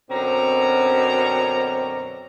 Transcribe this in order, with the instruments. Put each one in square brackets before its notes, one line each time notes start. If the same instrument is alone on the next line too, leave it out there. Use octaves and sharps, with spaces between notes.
[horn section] F#2 B2 D3 C4 C#4 A#5